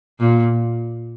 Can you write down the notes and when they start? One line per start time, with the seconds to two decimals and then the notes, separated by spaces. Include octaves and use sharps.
0.20 A#2